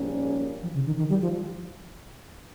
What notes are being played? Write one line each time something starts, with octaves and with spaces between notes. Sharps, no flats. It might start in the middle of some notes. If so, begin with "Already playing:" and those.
Already playing: A#1 G#2 G3 A#3 C#4
F3
C#3
D#3
D#3
G3
F3